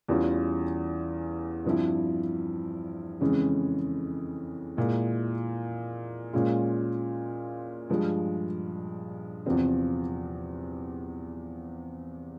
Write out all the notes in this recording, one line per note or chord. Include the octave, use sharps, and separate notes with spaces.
E2 E3 G3 C#4 F4
G2 F3 C4 E4
F2 C#3 E3 G#3 C#4
A#2 G#3 E4
A#2 G#3 C#4 F4
G2 F3 G#3
E2 C3 F3 C4